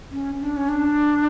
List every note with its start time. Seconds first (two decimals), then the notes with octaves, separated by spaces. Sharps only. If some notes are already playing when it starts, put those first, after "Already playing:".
0.11 C#4
0.40 D4
0.57 C#4
0.69 D4